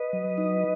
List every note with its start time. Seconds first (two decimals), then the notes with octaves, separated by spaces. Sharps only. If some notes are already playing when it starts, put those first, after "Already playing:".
Already playing: B4 D#5
0.13 F#3
0.38 D#4